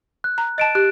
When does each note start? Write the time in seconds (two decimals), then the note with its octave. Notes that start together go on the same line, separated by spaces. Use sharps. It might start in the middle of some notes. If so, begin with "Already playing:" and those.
0.24 F#6
0.38 A#5
0.58 D#5 A5 A6 D7 E7
0.75 G4 F#6